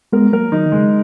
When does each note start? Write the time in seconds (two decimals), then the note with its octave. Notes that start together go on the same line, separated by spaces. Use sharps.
0.13 G#3 B3 A#4
0.32 F#3 A#3 A#4
0.52 D#3 F#3 D#4
0.66 D#3
0.72 C#3 G#3